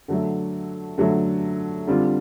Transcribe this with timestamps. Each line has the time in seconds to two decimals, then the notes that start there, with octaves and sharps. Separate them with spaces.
0.08 D3 F#3 A3
0.98 D3 F#3 A3
1.87 D3 G3 C4 F4